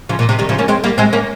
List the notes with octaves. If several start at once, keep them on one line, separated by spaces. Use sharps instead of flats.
C#3 F3
A#2
C3
D#3 G3
C#3 F3
A#3 C#4
G#3 C4
G3 A#3
G#3 C4
A#3 C#4